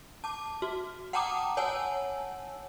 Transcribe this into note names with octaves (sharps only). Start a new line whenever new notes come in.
A5 D6
F#4
F#5 G5 A5 A#5 D6 D#6
C#5 F#5 G#5 A5 E6